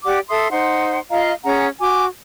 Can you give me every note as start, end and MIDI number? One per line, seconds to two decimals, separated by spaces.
0.04 0.19 67
0.04 0.19 74
0.04 0.19 78
0.04 0.19 86
0.29 0.50 69
0.29 0.50 76
0.29 0.50 84
0.29 0.50 87
0.51 0.99 63
0.51 0.99 72
0.51 0.99 78
0.51 0.99 84
1.11 1.31 65
1.11 1.31 75
1.11 1.31 77
1.11 1.31 82
1.44 1.68 61
1.44 1.68 68
1.44 1.68 78
1.44 1.68 82
1.80 2.06 66
1.80 2.06 80
1.80 2.06 86